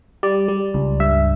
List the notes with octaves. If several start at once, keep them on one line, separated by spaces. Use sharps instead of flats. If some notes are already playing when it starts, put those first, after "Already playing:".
G3 D5
G3
C#2
G2 E5